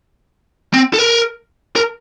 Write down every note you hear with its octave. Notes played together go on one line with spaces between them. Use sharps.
C4
A4
A#4
A#4